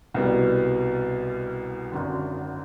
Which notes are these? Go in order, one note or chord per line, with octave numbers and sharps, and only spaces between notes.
C2 B2 G3
G#1 F#2 D3